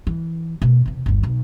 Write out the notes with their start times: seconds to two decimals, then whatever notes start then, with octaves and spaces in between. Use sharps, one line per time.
0.07 E3
0.62 B2 A3
0.86 E2 C3
1.06 G1 D#2
1.23 B1